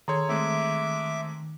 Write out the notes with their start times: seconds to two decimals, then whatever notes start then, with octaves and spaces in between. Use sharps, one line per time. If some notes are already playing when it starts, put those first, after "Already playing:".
0.08 D#3 G#4 A4 C#5 A#5 C6 G#6
0.29 G#3 A3 C4 E5 D6